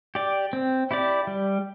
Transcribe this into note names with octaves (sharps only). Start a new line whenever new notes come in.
G4 D5
C4
E4 G4 D5
G3